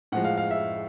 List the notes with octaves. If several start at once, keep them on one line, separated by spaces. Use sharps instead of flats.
A2 F3 G#3 F#5
F5
F5
E5